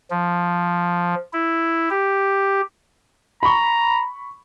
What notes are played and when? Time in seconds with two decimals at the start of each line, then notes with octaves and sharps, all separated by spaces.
0.11 F3
1.33 E4
1.90 G4
3.43 A#5 B5 C#6